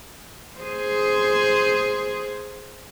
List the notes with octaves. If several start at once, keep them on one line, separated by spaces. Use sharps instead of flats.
G#4 C5